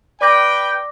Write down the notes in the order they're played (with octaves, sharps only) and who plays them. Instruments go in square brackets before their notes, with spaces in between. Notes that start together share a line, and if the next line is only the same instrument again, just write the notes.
[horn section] B4 G5 [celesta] D5 D6 A#6